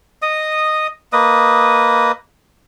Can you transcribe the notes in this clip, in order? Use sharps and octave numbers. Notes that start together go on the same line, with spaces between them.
D#5 D#6
A#3 B4 D#5 D#6